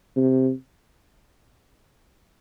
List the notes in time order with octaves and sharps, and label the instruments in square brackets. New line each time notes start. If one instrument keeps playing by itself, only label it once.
[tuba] C3